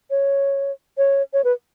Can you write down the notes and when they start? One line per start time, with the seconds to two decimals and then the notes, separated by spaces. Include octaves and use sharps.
0.10 C#5
0.98 C#5
1.33 C#5
1.44 B4